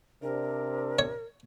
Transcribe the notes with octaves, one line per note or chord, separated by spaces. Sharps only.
C3 D4 A#4
C#5